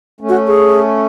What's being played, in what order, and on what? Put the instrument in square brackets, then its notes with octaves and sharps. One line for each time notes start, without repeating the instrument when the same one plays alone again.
[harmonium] A3 C#4
[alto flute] F#4
G#4